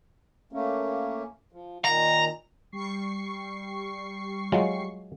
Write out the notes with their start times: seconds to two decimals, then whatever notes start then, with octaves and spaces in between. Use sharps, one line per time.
0.53 A3 A#3 C#4
1.52 F3
1.85 A#2 D#3 A#5
2.72 G3 C#6 C7
4.52 F#3 G#3 F4